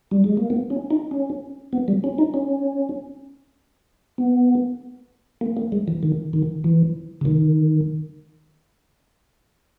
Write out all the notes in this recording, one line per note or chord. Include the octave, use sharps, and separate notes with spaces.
G3
G#3
A#3
B3
C#4
D#4
C#4
B3
G3
C#4
D#4
C#4
B3
A#3
A#3
G#3
E3
D#3
D#3
E3
C#3
D#3